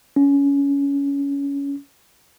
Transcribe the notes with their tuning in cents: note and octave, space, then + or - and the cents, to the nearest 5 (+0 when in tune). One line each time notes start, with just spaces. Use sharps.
C#4 +20